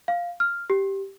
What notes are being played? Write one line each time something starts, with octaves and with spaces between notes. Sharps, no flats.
F5
F6
G4